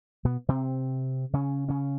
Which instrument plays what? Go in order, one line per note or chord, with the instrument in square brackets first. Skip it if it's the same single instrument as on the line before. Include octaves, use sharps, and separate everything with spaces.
[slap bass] B2 B3
C3 C4
C#3 C#4
C#3 C#4